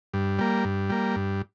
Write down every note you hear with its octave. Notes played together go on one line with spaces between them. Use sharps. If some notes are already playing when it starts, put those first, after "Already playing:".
G2
G3 A#3
G2
G3 A#3
G2